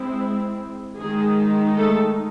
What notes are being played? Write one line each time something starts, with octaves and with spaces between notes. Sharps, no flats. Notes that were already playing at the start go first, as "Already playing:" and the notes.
Already playing: G#3 C4 E4
D#3 G#3 D#4 G#4
A3 A4